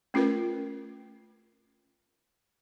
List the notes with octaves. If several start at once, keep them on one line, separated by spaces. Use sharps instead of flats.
A3 C#4 F4 A#4 B4